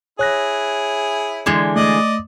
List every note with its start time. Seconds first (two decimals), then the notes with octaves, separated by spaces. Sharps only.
0.19 E4 G#4 C#5 F#6 A#6
1.46 D3 E3 G#3
1.76 A3 D5 D#5 D#6